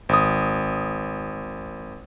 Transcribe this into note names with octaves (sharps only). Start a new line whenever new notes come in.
G#1 D#6